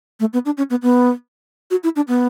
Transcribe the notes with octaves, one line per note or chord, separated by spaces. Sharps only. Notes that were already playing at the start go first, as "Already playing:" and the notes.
A3
B3
D4
C#4
B3
B3
F#4
E4
D4
B3